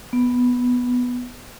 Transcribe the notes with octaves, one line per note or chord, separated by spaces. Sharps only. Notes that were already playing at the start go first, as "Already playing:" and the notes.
B3